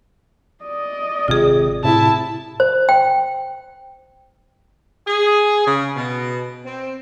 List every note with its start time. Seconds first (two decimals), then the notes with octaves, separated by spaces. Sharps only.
0.64 D5 D#5
1.28 G#1 C3 F4 G#4
1.84 A2 C3 E4 A5
2.60 C5
2.89 G5
5.07 G#4
5.65 C#3
5.96 B2
6.65 C4